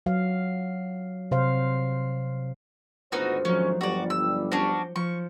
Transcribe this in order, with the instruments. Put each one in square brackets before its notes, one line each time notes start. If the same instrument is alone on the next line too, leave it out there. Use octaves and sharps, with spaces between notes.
[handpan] F#3 F5
C3 C5 F5
[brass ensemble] G#1 D2 C5 [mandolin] B3 D#4 F#4 [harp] F4 A4
[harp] F3 F#3 D#4 [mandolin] C#4
[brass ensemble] G1 G3 [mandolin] F#4 D5
[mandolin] E6
[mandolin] C#4 D4 F#4 [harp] C5
[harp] F3 [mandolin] C#6